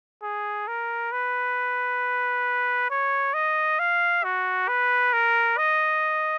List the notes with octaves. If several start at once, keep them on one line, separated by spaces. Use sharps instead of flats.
G#4
A#4
B4
C#5
D#5
F5
F#4
B4
A#4
D#5